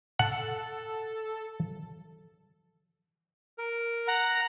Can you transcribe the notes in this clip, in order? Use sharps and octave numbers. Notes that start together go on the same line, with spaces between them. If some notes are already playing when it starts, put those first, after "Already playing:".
A4 F#5
A#4
F#5 A#5